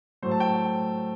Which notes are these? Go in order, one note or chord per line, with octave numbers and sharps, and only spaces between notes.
A2 F#3 A3 C5
A5
G5